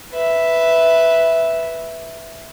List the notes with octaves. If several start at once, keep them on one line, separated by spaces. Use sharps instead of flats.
B4 E5